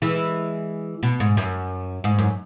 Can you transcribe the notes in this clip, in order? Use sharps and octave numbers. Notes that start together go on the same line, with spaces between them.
E3 G#3
B2
G#2
F#2
G#2
F#2